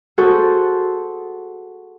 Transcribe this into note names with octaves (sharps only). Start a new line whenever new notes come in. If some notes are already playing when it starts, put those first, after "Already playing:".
F#4 G#4 A4 C5